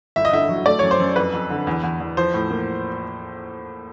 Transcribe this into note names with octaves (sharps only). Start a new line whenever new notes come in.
G1 E5
D#5
D3 E5
F#3
A3 D5
F#2 C#5
C5
F#2
F2 B4
F2
D3
E2
E2
E2
F3 C5
A2
A#3